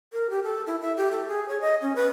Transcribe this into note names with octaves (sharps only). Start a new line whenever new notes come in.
A#4
G4
A4
E4
E5
G4
A4
G#4
C#5
D#5
C#4
B4